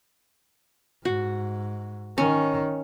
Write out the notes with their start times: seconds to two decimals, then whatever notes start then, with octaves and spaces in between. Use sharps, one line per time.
1.05 G#2 F#4
2.18 D#3 C#4